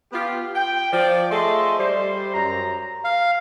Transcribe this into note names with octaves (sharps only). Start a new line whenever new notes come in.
B3 F4 G4
G5
F3 D5
A3 G#4 A4 D#5 C6
G3 C5
F#2 A#5
F5